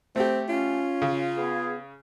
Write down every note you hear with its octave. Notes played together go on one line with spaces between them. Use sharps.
A3 C4 G4
C#4 F4
C#3
B3 G#4